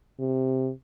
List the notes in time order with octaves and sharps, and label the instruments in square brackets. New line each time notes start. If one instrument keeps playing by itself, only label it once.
[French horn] C3